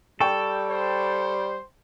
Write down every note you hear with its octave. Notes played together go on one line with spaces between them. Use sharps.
G3 A4 G5 C#6
C5